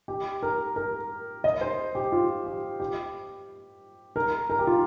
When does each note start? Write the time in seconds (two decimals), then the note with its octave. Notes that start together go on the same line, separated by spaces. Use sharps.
0.08 G4
0.43 A#4
0.76 A#4
1.44 D#5
1.61 C5
1.95 G4
2.12 F4
2.46 G4
2.80 G4
4.16 A#4
4.50 A#4
4.59 G4
4.67 F4